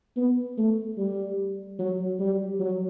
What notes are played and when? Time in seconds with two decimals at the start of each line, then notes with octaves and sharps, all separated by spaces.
0.17 B3
0.57 A3
0.98 G3
1.79 F#3
2.19 G3
2.59 F#3